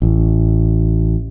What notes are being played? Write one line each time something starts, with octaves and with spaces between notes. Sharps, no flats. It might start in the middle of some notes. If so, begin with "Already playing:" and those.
A1